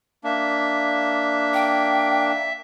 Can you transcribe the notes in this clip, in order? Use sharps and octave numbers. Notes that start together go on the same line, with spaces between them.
A#3 D4 E5
G5